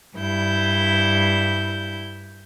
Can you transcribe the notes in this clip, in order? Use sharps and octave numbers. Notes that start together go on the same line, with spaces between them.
G2 E4 G6